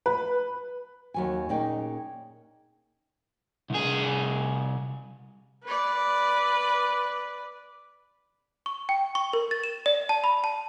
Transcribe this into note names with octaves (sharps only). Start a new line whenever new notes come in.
B4
D#2 F#3 G#5
A#2 C#4 D#4 G#4 G5
C2 G#4
B4 D5
C#6
G5
C#6
A#4
A6
E7
D5
A5
B5
A5